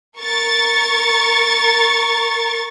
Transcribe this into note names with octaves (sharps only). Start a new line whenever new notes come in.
A#4 C#6 A6